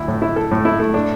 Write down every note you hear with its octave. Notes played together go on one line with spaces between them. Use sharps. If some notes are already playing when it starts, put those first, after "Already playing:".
Already playing: D2 E4
A2
E4
A4
A2
E4
A3
D4